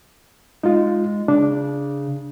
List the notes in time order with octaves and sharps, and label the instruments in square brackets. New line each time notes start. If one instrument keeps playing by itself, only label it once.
[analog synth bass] G#3 [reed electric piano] D#4 F4
[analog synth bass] C#3 [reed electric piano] D4